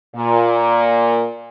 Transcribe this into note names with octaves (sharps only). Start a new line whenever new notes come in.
A#2